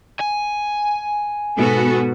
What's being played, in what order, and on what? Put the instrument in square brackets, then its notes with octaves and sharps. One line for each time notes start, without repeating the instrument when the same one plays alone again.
[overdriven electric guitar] G#5
[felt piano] G#2 B2 [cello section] B3 F#4 A4